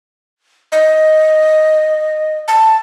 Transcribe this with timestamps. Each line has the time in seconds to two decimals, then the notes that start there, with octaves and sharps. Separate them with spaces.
0.72 D#5
2.48 A5